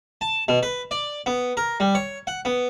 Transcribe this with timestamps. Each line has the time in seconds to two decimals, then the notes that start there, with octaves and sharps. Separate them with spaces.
0.21 A5
0.48 B2
0.63 B4
0.91 D5
1.26 B3
1.57 A#4
1.80 G3
1.95 C#5
2.27 F#5
2.45 B3